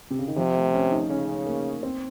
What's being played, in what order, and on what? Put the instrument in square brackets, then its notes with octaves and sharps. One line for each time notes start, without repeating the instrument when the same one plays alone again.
[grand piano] C3
C#3
D#3
[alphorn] C3 [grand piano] F3
[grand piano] A3
C#4
D#4
[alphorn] C#3 [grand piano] C#4
[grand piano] A#3
C4